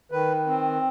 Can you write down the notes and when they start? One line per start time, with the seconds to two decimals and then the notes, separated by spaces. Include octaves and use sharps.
0.12 D#3 B4
0.47 C4